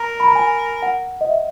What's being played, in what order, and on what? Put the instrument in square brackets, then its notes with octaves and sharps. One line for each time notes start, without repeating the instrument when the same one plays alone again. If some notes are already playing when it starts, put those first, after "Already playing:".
Already playing: [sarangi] A#4 [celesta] A#5
[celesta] B5
A#5
G#5
F#5
D#5
E5